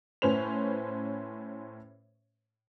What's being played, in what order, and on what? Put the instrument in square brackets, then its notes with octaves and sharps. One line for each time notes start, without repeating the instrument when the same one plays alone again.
[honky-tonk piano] A2 C#4 B4 C5 F7